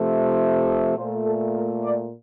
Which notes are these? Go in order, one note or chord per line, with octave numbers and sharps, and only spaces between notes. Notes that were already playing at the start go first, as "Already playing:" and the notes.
Already playing: C3 F3 A3
A#2 A3 C5
A4
A#4
D5